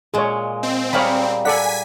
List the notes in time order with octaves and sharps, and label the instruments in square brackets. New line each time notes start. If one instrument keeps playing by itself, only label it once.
[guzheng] A#2 G#3 [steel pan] G#4 C#5
[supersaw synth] C4
[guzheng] G3 A#3 G#4 [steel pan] C#5 F5 B5
[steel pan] A4 D5 F#5 [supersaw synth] G#5 B6